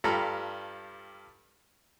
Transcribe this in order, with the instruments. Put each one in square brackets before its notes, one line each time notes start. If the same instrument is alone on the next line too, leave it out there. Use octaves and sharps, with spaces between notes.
[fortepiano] G2 G3 F4 A4 A#5 B5